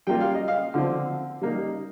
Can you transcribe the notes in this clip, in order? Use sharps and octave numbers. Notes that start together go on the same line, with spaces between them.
G3 A#3 F4 G5
F5
D#5
F5
D3 F3 C4
G3 A#3 D#4